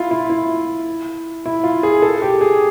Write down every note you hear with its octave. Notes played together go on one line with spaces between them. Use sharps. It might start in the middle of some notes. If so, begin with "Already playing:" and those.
Already playing: E4 F4
E4
E4
E4
F4
G#4
A4
G4
G#4